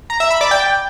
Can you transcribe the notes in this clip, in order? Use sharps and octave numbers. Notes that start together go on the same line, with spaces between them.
A#5
E5
B5
D5
G5